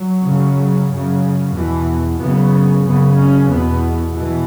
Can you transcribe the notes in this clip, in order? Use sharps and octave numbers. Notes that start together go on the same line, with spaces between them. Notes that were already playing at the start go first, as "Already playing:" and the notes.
Already playing: F#3
F#2 C#3
F#2 C#3
E2 B2 E3
F#2 C#3 B3
F#2 C#3 B3
C#4
E2 B2 B3
B2 E3